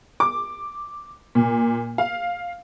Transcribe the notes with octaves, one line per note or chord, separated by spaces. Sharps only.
D6
A#2
F5